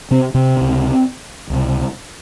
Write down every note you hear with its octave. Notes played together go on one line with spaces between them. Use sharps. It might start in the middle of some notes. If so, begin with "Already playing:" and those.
C3 C4
C3 C4
C#2 C3
C#2 C3